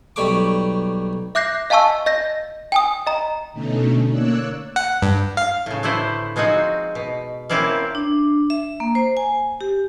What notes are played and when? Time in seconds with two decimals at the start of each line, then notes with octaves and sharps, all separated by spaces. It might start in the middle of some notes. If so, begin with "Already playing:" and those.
0.16 B1 G3 A3 C#6 D6
1.35 E5 D6 F#6 G6 A#6 C7
1.70 D#5 F5 G#5 A5 C#6 E6
2.06 D#5 G6 A#6
2.72 G5 G#5 D#6
3.07 D#5 A#5
3.53 B2 D3 A3 C#4 D#4
4.10 A#3 C#5 D5 E6 F#6
4.76 F#5
5.02 G2
5.37 F5
5.66 A2 C#3
5.83 D3 A3 E4 B4 C5
6.36 F3 G#3 C4 D#4 F#4
6.95 B2
7.49 A#3 C4 C#4 E4 D5 F5
7.95 D4
8.50 E5
8.80 A#3
8.95 C5
9.17 G#5
9.61 G4